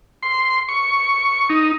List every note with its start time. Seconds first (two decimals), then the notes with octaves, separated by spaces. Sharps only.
0.23 C6
0.68 C#6
1.49 D#4